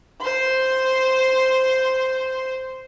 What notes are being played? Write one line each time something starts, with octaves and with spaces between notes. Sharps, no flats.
C5 C6